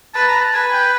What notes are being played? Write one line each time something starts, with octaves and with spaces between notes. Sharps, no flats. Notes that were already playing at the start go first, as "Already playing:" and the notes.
B4 A5
A#5
A5
B4 G#5
G5